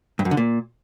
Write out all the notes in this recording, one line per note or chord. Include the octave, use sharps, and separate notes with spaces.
G2
F#2
D3
A#2